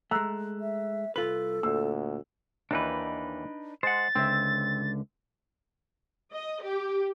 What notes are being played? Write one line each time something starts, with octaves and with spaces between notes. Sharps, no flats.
G#3 A3 A#5 E6 F#6
E5
C2 F4 A4 B4 F#7
D2 A#2 E6
D#2 E3 D4 D#4 B4
G#3 C5 F#5 A6
C#2 D3 C4 E5
D#5
G4